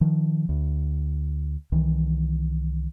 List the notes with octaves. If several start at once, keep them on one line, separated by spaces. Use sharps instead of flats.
D#3 F3
D2
C2 D#3 E3